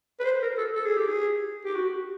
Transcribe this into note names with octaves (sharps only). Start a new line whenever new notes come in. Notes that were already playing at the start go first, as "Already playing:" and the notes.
B4
C5
A#4
A4
A4
G#4
G4
G#4
G4
F#4